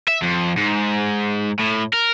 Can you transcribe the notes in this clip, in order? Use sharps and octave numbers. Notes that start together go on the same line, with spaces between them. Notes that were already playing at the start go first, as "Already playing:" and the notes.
E5
F2
G#2
A2
A#4